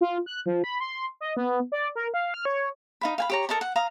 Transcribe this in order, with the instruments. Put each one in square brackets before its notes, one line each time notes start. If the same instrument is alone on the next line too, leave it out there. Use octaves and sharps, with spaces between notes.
[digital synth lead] F4
F#6
F3
B5
C6
D#5
B3
D5
A#4
F5
F6
C#5
[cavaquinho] D#4 F5 B5
F5 G#5 B5
G4 C#5 A#5
A4 A#4 D#5 A#5
F#5
F5 A#5 D#6